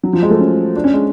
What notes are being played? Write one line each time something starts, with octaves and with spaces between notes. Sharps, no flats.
F#3
F3
G#3
A3
C#4
D4
C#4
G#3